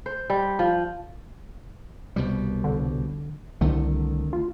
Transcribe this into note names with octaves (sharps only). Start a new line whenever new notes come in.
C5
G3
F3
C2 B2 G3
D3
C2 D3 D#3 A3
F4